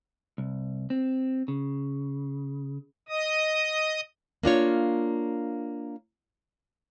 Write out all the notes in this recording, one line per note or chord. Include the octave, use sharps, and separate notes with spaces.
C2
C4
C#3
D#5 D#6
A#3 D4 F4 C#5